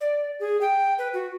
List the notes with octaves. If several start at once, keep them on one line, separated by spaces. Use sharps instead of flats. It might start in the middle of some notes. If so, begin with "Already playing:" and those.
D5
G#4
G5
B4
F#4